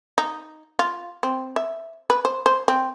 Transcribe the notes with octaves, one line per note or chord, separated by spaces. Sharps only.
D#4
F4
C4
E5
B4
C5
C5
C4